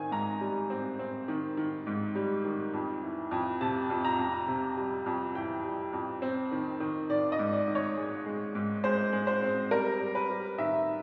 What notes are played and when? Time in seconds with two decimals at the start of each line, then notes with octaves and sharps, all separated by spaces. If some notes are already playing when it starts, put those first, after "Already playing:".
Already playing: D#3 C4 G#5
0.11 G#2 A#5
0.41 G3
0.70 C4
0.99 C4
1.28 D#3
1.57 D#3
1.87 G#2
2.15 G3
2.45 D#3
2.73 F2
3.03 E3
3.31 F2
3.61 C3 A5
3.90 F2
4.05 A#5
4.19 F2
4.48 C3
4.77 G3
5.06 F2
5.35 E3 G5
5.64 G3
5.93 F2
6.22 C4
6.52 D#3
6.80 D#3
7.10 D#3 D5
7.32 D#5
7.39 G#2
7.53 D5
7.68 D#3
7.75 C#5
7.97 G#3
8.26 G#3
8.55 G#2
8.84 G#3 C5
9.13 G#3
9.27 C5
9.43 C4
9.71 G3 A#4
10.00 G3
10.15 B4
10.30 G3
10.58 D#3 E5